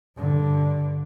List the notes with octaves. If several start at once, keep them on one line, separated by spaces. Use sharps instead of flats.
G2 D3